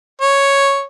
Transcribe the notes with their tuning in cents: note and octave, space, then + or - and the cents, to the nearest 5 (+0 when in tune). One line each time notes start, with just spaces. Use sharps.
C#5 +0